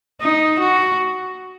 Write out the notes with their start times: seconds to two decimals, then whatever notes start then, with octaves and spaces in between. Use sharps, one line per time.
0.21 D#4
0.60 F#4